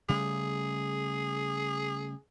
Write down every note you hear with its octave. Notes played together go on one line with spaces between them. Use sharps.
C#3 G3 A3 G#4